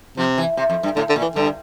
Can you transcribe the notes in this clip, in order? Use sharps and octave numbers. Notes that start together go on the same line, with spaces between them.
C3 F3
E3
C3
F2
G2
A2 D3
D3
A#2
E3
G2 D3